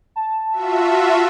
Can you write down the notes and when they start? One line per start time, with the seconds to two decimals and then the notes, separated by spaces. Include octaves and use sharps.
0.16 A5
0.52 F4 F#4 E5